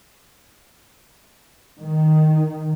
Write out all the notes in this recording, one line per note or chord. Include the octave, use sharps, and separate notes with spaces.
D#3